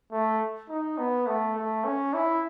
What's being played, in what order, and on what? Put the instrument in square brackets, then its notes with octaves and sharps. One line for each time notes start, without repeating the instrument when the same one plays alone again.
[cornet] A3
D#4
B3
A3
A3
C#4
E4